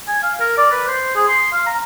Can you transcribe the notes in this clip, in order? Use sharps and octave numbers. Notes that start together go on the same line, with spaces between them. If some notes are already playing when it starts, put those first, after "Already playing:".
G#5
F5
A#4
D5
B4
C5
G#4
C6
F5
A#5